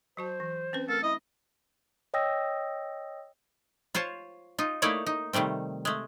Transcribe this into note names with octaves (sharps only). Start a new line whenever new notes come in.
F#3 F#4 C5 A5
E3
C4 C#4 B4
A3 A4 A#4
E4 D#5
C#5 D#5 G5 D#6 E6 A#6
F4 C5 C#5 A5
D#4 F4
A3 A#3 D#4 E4 C#5 D5
D#4
C3 D#3 G3 A3 C4
G#3 A3